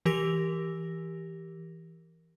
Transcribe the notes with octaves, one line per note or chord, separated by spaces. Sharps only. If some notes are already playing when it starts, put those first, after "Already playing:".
E3 G4 A#4 E6 A#6 F7